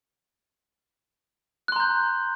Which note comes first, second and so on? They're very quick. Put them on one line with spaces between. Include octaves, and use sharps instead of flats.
F#6 C6 A#5 G6